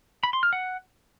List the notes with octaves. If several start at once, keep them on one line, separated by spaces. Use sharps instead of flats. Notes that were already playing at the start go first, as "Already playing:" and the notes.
B5
C6
F6
F#5